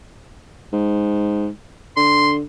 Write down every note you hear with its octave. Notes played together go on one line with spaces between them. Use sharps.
G#2
D3 C6